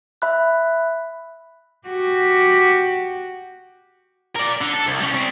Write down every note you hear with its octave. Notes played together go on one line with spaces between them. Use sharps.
E5 B5 F#6
F#4 G4
A#4 D5
D3
A4
C2
G3 C#4
G3 C4